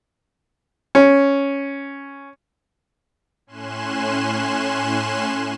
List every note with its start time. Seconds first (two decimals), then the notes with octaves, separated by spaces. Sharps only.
0.95 C#4
3.47 A2 C#4 G#5 C6 F#6 E7